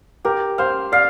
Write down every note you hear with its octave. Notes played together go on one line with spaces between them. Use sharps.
G4 A#4
C5 F5
D5 F5